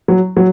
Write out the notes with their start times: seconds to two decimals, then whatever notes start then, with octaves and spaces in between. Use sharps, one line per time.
0.08 F#3
0.37 F#3